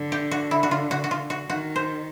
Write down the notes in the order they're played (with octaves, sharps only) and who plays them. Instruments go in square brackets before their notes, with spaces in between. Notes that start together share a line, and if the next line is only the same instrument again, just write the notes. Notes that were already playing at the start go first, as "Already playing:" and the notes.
Already playing: [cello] D3
[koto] G4
F#4
E4
F#4
F4
F#4
F#4
F4
F#4
[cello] D#3 [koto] F#4
[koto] C5